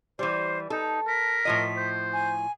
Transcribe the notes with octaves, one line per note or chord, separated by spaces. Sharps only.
E3 G3 C5
D#4 A4
A#4 B6
A2 F3 D#5
C5
G#5